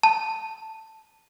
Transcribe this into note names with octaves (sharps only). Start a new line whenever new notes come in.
A5